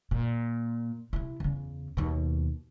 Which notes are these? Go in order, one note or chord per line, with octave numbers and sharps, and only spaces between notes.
A#2
C3 E4
E2 C#3
D#2 B2